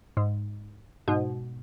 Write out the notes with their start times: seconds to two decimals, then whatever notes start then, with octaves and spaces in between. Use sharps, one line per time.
0.17 G#2
1.08 G#2 B2